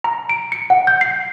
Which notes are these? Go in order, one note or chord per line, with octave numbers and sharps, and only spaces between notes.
A#5
D7
C#7
F#5
G6
C7